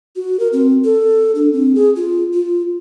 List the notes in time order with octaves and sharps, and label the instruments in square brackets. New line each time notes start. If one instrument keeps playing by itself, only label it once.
[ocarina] F#4
A#4
C4
A4
D4
C4
G#4
F4
F4